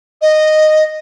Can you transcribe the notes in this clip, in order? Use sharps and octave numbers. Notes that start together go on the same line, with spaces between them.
D#5